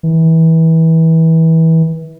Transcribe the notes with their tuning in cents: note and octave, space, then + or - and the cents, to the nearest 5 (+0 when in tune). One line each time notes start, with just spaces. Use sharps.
E3 -25